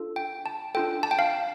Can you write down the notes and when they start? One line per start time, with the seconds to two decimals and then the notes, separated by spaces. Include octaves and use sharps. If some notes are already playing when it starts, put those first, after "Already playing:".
Already playing: D4 F4 A4
0.16 G5
0.46 A5
0.75 D4 F4 A4 G5
1.03 A5
1.11 G5
1.19 F5